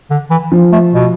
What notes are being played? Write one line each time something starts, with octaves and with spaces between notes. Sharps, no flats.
D3
E3
F3
A3
B2